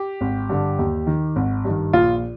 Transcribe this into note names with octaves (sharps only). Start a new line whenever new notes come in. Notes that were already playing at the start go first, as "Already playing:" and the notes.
Already playing: G4
G#1
G2 D3
D#2
D#3
G#1
G2 D#3
A#1 F4